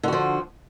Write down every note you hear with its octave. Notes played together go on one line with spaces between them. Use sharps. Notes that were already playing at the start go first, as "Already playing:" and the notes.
D3 F3 F#4